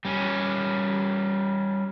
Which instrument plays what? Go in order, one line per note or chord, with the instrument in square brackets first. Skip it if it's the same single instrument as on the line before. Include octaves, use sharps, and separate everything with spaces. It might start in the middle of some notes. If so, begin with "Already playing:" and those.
[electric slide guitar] G3 C#4